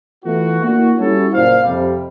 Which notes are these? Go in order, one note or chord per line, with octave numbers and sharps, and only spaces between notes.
E3 A3 B3 F4 F#4
A#3 D4 E4 F#4
G3 C#4 E4 F#4 A4 C#5
F#1 A#2 C5 F5
F2 C3 G3